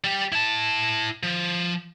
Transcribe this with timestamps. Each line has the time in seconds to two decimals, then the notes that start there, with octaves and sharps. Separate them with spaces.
0.04 G3 G4
0.32 E4 A5
1.23 F3